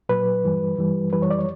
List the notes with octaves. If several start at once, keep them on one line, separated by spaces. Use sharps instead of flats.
A#2 F#3 B4
G2 E3 G3
G2 E3 G3
F#2 E3 G3 B4
C#5
D5
C#5